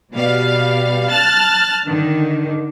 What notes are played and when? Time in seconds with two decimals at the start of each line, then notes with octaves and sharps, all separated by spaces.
0.15 B2 G3 F5
1.10 A5 F6 F#6 A6
1.86 D3 D#3